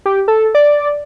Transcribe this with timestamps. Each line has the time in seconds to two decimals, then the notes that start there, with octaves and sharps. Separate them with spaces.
0.06 G4
0.28 A4
0.55 D5